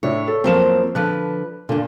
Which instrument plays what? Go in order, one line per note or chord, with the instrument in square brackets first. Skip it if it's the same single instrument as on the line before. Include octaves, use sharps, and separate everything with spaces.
[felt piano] A2 D4 E4 [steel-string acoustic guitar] C#5
[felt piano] A4
[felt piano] F2 A#3 E7 [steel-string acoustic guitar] F3 F#3 C4
[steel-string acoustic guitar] D3 F3 B4 [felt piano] F#6
[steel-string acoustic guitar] G2 D3 [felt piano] A#2